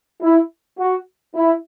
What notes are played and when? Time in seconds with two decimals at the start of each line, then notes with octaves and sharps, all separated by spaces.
0.22 E4
0.78 F#4
1.35 E4